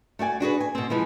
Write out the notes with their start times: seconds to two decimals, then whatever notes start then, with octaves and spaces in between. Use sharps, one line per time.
0.19 A3 F#4 D5 G#5
0.40 D4 F#4 G#4 B4
0.60 G#5
0.75 B2 C4
0.90 E3 F3 G#3 B3